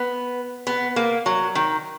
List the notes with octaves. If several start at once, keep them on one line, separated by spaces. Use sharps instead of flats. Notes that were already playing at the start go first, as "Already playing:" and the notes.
Already playing: B3
B3
A#3
F#3
D#3